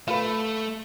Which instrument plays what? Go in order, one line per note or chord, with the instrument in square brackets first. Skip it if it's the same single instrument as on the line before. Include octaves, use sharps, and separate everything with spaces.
[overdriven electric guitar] A3 [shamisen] F4 B4